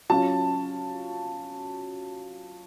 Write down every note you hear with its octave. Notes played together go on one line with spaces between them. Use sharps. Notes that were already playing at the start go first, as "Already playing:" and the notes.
F#3 C#4 F4 A5